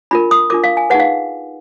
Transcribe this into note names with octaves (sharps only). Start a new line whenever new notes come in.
D4 F4 A#4 B5
D#6
D4 F4 A#4 D6
F5
G#5
D#4 G#4 B4 F#5
F5